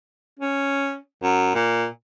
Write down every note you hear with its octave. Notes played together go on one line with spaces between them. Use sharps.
C#4
F#2
A#2